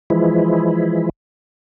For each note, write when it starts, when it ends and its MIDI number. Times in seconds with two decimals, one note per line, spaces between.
0.10 1.09 52
0.10 1.09 53
0.10 1.09 56
0.10 1.09 64